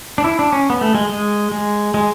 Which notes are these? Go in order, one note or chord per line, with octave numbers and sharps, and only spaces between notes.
D4
E4
D4
C#4
B3
A3
G#3
G#3
G#3
G#3